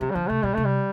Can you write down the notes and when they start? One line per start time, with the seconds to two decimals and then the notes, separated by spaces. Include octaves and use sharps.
0.01 C3 F3
0.10 G3
0.15 D3 F3
0.29 C3 A3
0.43 B2 G3
0.54 C3 A3
0.65 G3